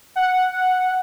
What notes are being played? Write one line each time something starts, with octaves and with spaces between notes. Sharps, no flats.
F#5